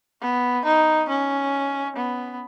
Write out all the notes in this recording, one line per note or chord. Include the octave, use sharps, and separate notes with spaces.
B3
D#4
C#4
B3